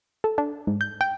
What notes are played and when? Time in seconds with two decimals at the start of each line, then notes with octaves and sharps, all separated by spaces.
0.24 A4
0.38 D4
0.67 G#2
0.81 G6
1.01 G5